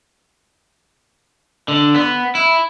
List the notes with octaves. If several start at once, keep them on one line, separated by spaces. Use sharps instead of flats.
D3
B3
E4